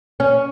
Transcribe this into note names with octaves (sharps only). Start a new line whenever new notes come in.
C#4